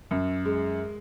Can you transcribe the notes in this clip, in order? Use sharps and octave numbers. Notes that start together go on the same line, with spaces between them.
F#2
G#3